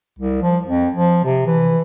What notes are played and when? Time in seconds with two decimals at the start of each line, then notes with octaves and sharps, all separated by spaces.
0.19 C2
0.42 F3
0.67 F2
0.94 F3
1.24 C3
1.47 E3